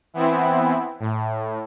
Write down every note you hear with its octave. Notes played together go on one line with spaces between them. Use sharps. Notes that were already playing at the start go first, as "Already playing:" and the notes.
E3 B3 C4 E4
A2